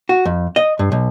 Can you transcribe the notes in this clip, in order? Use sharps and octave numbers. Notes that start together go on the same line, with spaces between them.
F#4
F2
D#5
G2
B1